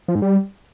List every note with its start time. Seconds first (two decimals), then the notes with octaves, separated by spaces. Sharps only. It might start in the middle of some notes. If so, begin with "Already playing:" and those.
0.08 F3
0.15 G#2
0.22 G3